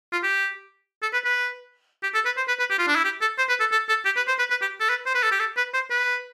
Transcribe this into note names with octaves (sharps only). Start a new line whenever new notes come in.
F4
G4
A4
B4
B4
G4
A4
B4
C5
B4
B4
G4
F4
D4
E4
G4
A4
C5
B4
A4
A4
A4
G4
B4
C5
B4
B4
G4
A4
B4
C5
B4
A4
G4
A4
B4
C5
B4